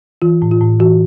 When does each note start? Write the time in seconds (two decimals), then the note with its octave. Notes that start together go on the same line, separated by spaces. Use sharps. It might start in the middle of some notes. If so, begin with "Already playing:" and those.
0.22 E3 F4
0.42 A2
0.51 F4
0.61 A2
0.80 E3 F#4